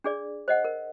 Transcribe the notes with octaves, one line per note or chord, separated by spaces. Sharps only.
D4 G#4 D5
C5 D#5 F#5
A#4